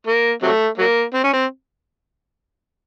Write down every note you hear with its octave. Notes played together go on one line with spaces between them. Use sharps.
A#3
C3 F#3 A3
F#3 A#3
C4
C#4
C4